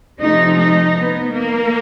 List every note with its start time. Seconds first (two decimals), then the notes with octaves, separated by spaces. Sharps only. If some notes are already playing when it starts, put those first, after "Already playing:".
0.20 C3 F3 A3 D#4
0.58 D#4
0.97 B3
1.35 A#3